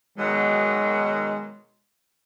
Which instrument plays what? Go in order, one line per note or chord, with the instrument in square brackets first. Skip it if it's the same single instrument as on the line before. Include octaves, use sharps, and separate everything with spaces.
[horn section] B2 D#3 F#3 [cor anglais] G#3